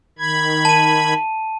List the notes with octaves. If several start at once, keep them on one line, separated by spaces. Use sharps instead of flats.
D#3 B5 G#6
A5 D#7